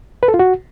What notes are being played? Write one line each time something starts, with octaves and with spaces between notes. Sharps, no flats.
B4
A4
F4
F#4